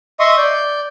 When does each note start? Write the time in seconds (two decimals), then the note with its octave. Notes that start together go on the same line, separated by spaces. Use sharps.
0.20 D#5 E5 C6 C#6 D#6
0.38 D5 G6